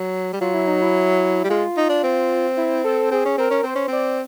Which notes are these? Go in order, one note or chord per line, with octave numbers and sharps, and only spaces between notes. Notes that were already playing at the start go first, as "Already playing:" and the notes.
Already playing: F#3
G3
F#3 F4
E4
D#4
E4
G3
G#3 F4
D#4
D4
C4
E4
A4
C4 G#4
C#4
C4 A#4
C#4
C4 C5
C#4
C4 D5